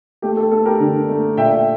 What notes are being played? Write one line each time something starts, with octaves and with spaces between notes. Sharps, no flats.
A3 G4
A4
A3 A4
G4 A#4
D3
A3
A#2 E5 G5